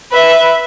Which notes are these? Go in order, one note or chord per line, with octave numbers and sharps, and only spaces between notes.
B4 E5